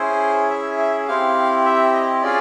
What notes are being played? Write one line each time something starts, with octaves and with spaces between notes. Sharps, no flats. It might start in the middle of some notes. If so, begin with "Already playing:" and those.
Already playing: C#4 E4 G#4 C5
E5
E5
C4 E4 G4 F5
E5
D#5
C#4 F4 G#4 D5